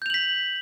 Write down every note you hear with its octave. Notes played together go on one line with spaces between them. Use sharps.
G6 B6 F7 F#7